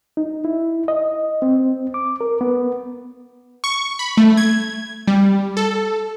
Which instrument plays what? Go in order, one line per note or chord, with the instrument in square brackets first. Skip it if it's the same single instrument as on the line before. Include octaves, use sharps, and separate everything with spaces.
[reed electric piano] D#4
E4
D#5
C4
D6
A#4
B3
[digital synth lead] C#6
B5
A3
G#6
G3
A4